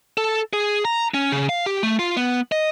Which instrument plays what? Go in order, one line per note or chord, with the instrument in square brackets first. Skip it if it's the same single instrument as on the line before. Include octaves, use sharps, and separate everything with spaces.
[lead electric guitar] A4
G#4
A#5
C#4
C#3
F5
G4
A3
F4
B3
D#5